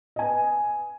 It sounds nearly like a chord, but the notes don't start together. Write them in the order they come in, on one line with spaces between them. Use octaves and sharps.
D#5 G#5 B4